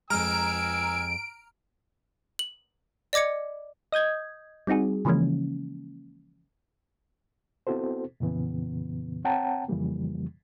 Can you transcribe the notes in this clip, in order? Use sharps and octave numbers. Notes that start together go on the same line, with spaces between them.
F2 G#3 G#5 A#5 E6 F6 D7
F#7
D5 D#5 D6 G#6 C#7
D#5 D#6 G6 G#6
G3 C4 D#4 F#4 G#4
C#3 E3 F3 G#3 A#3 C#4
B3 C4 E4 F#4 A4 C5
F2 A#2 C#3 E3 B3
C4 C#5 F#5 G5 A5 A#5
F2 C#3 E3 F3 G3 A#3